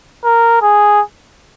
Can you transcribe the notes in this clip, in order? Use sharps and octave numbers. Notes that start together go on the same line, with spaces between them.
A#4
G#4